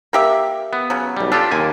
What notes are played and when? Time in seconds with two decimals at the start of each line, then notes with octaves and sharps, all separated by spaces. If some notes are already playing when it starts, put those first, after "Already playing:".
0.13 A#3 G4 E5
0.73 B3
0.90 C#3 F#3
1.17 B1 G3
1.32 D4 F4 G4 A4
1.51 D#2 A#3 G#5